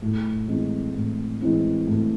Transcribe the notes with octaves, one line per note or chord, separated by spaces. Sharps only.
A2
E3 G#3 C4 E4
A2
E3 G#3 C4 E4
A2